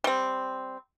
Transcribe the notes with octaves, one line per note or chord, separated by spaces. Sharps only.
G3 C4